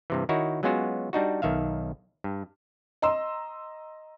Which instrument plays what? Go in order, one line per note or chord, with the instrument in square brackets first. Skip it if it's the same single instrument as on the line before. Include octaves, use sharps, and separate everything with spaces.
[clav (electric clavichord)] G2 C3 E3
D#3 D#4 E4 F#4 C#5
F#3 G#3 B3 C#4 F4 F#4
G3 D4 D#4 F#4
B1 D#3 E5 F5
G2
[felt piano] D#5 A#5 C6 E6